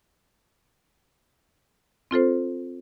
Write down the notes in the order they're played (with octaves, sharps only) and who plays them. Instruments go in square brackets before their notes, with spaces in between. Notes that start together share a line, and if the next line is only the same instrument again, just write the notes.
[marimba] C4 F4 A4 C5